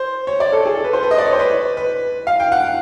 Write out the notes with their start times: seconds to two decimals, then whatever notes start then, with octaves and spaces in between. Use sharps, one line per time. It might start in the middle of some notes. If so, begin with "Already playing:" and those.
Already playing: C5
0.27 C#5
0.40 D5
0.52 A4
0.66 G#4
0.75 A4
0.84 B4
0.93 C5
1.03 B4
1.11 D#5
1.18 D5
1.26 C#5
1.33 C5
1.39 B4
1.77 B4
2.27 F5
2.40 G5
2.52 F#5